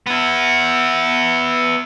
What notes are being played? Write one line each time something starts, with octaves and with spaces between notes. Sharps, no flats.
B3 E4